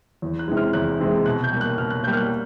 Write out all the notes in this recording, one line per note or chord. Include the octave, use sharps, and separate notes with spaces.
E2
F#6
C3 E3 G#3
F6
E2 F#6
C3 E3 G#3
B2 F#6
G6
G3 A#3
F#6
B2 F6
F#6
G3 A#3 G6
F6
F#6